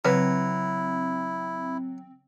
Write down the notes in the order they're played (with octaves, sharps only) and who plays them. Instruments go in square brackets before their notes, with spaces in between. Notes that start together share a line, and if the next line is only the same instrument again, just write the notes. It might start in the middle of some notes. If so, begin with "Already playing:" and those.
[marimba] C#3 B4 [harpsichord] F#3 [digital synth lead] C4 [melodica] E4